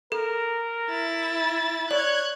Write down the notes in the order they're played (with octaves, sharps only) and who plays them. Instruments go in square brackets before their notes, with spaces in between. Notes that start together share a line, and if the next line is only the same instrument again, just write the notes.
[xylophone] A4 [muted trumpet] A#4
[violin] E4 A6
[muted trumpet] C#5 [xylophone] D5 [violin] F#6 G#6